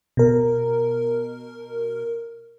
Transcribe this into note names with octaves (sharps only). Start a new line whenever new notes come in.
B2 A#4